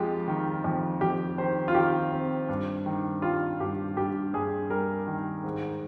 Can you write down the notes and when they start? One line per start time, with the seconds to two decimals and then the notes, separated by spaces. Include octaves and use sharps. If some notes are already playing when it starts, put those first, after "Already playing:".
Already playing: F2 G#3 F4 G4
0.28 D#3
0.64 F2
1.01 F2 G4
1.38 D#3 C5
1.68 F4
1.74 D#3 G4
2.12 C4
2.49 G2
2.86 D#3
3.22 G3 F4
3.60 G2 G4
3.97 G2 G4
4.34 G2 G#4
4.70 G3 A#4
5.07 D#3
5.44 G#2